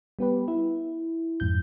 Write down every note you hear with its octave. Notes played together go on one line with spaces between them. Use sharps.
G3 B3 G4 B4
E4
F2 G#2 G6